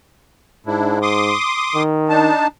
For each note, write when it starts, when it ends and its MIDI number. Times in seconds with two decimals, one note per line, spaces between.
0.66 1.33 44
0.66 0.99 62
0.66 0.99 64
1.02 1.83 84
1.02 1.83 86
1.02 1.83 87
1.75 2.29 51
2.09 2.47 62
2.09 2.47 63
2.09 2.47 81